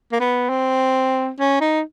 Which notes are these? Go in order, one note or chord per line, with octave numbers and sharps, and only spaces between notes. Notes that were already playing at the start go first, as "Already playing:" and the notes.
A#3
B3
C4
C#4
D#4